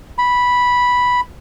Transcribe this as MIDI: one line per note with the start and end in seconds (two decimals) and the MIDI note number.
0.18 1.20 83